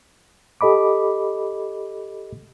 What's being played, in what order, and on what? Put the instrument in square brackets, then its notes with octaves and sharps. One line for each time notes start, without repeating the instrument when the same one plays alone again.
[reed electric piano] G4 A4 D#5 B5 D6